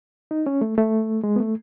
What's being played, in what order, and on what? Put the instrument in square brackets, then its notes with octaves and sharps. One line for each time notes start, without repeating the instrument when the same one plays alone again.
[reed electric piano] D#4
C#4
A3
A3
G#3
B3
A3